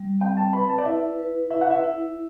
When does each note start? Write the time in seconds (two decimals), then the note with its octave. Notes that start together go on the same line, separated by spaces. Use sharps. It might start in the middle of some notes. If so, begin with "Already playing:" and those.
Already playing: G3
0.20 C4 G5
0.37 A5
0.53 B4 B5
0.69 A5
0.78 D5
0.85 E4 E5
1.19 B4
1.50 E4 E5
1.61 F#5
1.70 E5
1.84 E4